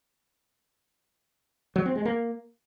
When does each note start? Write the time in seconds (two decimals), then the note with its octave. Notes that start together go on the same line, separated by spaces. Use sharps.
1.76 F#3
1.86 C4
1.95 G#3
2.05 A#3